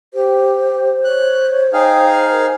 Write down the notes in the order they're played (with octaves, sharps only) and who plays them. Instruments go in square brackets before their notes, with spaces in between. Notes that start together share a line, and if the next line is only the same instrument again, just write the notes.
[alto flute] G4 [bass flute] C5
[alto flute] C#5 [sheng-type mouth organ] F#6
[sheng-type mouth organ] D#4 G#4 F5 [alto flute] G5
[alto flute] A#4